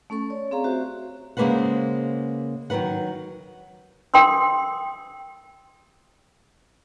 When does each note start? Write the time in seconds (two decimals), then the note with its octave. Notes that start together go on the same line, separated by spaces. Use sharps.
0.10 A3 C#4 A4 C#6
0.30 C#5 D5
0.51 C4 G#4 F5 A#5
0.64 F#4 G4 C5 E5 F5
1.37 C#3 G#3 A#3 B4 C5 F#5
2.70 D#3 F#3 A#4 B4 F#5
4.14 A#4 G5 C6 D6 D#6